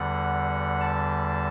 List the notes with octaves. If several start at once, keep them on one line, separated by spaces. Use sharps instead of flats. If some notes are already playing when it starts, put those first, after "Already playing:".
Already playing: E2 D3 G3 F#5
A5